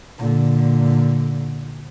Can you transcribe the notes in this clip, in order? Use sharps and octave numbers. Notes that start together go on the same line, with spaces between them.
A#2 D3